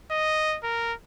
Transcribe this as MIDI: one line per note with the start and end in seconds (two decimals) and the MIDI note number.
0.11 0.58 75
0.64 0.94 70